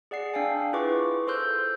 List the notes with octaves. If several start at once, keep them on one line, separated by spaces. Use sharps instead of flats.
G#4 D5 F#5 C7
D4 F5 G5 G#5
E4 F4 G#4 B4 C#6 D6
A4 C5 C6 E6 F#6 G6